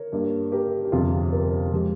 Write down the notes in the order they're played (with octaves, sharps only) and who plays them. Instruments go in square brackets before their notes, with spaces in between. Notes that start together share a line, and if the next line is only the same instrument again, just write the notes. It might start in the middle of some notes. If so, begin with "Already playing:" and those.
Already playing: [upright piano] A#4 C#5
G2 G3 A#3
G4 A#4
G4
G1 F2 C3 F4 G#4
G4 A#4
F3 G#3 G4